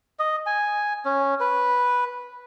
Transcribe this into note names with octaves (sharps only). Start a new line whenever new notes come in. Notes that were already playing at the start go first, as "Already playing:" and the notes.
D#5
G#5
C#4
B4